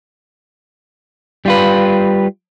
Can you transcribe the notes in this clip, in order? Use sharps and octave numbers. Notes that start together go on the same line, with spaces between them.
G3 F4 B4